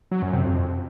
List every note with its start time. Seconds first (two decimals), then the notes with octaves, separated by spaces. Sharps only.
0.11 F#3
0.22 F#2
0.33 C3
0.44 F2